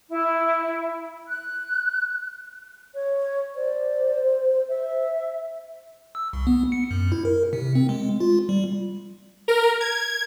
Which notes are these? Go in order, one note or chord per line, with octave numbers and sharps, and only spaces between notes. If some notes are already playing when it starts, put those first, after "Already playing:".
E4
F#6
C#5
C5 D5
E5
E6
C2
B3
C#7
F#2
E4
A#4
C3
C4
G#3
F4
G3
A#4
G#6